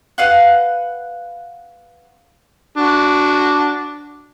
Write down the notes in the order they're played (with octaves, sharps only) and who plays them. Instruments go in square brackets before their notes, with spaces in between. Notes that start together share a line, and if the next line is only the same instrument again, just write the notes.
[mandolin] B4 F5 F#5
[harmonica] D4 F#4